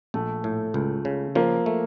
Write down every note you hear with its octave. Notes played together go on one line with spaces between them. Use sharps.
A#1 A3
A2
C#2
C#3
F3 A#3
A3